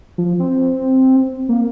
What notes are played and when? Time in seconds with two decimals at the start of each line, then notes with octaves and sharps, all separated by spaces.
0.18 F3
0.40 C4
1.49 A#3